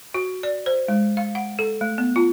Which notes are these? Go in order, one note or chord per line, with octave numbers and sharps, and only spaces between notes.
F#4
D5
C5
G#3
F5
F#5
A4
A3
B3
F4